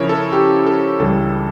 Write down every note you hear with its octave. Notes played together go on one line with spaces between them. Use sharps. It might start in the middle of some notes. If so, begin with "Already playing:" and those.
Already playing: C#3 F3 C#4 E4 A#4 C#5
A4
G4
A4
C#2 C#3 E3 G3 D4 A4